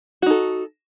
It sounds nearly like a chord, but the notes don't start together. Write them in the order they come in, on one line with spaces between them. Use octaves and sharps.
F#4 D#4 A4